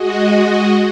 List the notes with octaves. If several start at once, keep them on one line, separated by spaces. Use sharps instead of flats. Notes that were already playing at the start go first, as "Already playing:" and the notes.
Already playing: G#3 F#4 D#5